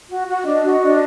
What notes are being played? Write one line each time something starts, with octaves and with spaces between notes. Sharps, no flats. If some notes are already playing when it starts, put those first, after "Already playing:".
F#4
F#4
D4 D#5
F#4
D4